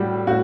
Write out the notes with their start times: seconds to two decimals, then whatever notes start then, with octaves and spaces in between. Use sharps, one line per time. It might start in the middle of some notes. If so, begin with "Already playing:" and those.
Already playing: A2 G3 F#4 G4
0.27 A2 F#4